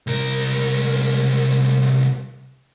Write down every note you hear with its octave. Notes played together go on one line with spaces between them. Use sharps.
C2 A#4